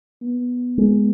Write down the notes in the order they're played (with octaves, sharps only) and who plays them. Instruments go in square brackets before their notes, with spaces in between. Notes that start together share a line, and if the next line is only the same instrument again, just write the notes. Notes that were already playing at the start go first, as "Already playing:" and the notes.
[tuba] B3
[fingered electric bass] G#3